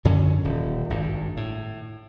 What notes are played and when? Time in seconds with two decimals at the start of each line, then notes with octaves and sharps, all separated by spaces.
0.05 F#2 D3 F#3 C#4
0.44 D#1
0.90 G#1 G2
1.37 A2